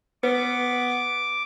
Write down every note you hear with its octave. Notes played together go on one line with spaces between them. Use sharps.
B3 B4 D6